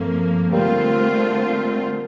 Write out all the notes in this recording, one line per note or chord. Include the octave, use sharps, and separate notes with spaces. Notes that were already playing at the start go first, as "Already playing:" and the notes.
Already playing: G2 F3 A3 A#3 C4
D3 G3 A3 A#3 C4 F4